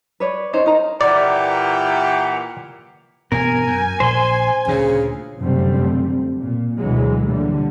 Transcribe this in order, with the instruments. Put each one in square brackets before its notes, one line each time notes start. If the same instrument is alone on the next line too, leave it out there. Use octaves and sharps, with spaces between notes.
[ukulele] B4 C#5 D5
C#4 D#4 C5 C#5
D#4 A#4 A#5
[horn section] A#2 E3 G4 [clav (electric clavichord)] D5 [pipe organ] F#5 A#5
[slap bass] E1 G2 B3 [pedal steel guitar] A#4 [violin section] G#5
[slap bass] F#2
[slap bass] A#1 [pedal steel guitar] C5 C6
[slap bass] D2 A#2 [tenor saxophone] C#3
[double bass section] F1 F#2 D3 G3 A3 C4
A#2
D2 B2 D3 E3 F#3 G#3
A#2 D3 G3